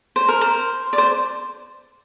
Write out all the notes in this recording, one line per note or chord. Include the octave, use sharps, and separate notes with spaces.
C5
A#4
C5
D5
C5